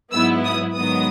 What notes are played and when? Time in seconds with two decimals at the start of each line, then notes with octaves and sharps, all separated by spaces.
0.12 G#2 F#3 B3 E4 E6
0.44 D#6
0.75 G#2 D#3 F#3 B3 D#6